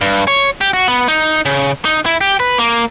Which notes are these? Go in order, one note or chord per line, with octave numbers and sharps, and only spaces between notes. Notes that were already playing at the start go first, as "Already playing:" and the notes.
G2
C#5
G4
F#4
B3
D#4
C#3
D#4
E4
G4
B4
A#3